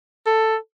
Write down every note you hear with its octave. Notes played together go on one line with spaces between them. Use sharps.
A4